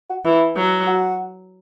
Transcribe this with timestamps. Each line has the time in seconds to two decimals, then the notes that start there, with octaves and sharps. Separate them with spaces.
0.10 F#4
0.25 E3 E4
0.56 F#3
0.87 F#4